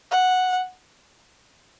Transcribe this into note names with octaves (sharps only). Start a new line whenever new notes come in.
F#5